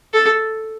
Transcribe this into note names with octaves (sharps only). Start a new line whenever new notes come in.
A4